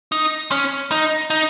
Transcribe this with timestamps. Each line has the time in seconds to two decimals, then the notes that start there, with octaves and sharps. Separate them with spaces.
0.12 D#4
0.52 C#4
0.91 D#4
1.30 D#4